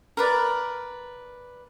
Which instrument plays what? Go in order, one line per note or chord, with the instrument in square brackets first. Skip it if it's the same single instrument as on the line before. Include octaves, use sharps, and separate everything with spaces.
[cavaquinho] A#4 B4 D5